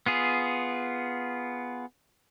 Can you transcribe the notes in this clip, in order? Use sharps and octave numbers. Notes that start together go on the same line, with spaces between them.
B3 F4 G#4